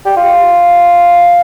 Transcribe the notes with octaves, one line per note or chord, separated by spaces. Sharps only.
G4
F4